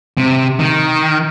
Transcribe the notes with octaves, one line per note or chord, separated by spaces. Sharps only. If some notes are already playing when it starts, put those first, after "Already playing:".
C3
D#3